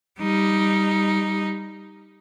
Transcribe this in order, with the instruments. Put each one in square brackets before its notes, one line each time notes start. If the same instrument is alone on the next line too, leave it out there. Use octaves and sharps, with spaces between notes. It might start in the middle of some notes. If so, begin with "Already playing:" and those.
[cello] G3 D#4